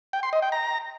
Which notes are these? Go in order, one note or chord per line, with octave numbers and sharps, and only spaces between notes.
G5
C6
D#5
G5
A#5